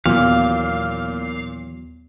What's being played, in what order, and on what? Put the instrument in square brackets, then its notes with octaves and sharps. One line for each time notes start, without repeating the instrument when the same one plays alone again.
[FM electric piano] D#2 B3 [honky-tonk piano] A#2 [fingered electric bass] E3 F#3 [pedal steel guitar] F5